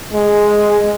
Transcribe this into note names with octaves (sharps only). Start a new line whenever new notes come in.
G#3